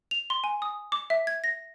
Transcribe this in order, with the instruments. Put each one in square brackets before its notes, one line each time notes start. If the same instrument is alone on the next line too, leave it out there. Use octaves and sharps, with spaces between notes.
[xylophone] F7
C6
G#5
D#6
D6
E5
G#6
A#6